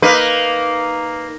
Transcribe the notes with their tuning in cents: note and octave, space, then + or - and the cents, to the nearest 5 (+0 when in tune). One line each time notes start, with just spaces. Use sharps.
A#3 +0 D#4 +0 B4 +5